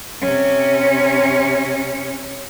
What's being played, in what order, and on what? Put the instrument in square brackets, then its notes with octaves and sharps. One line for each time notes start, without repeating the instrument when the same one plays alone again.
[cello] C3 C#4